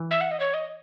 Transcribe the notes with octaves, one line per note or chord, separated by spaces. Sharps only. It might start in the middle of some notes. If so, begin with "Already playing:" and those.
Already playing: E3
E5
F#5
D#5
C#5
D#5